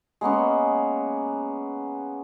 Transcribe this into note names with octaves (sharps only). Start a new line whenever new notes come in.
G#3 A#3 B3 C#4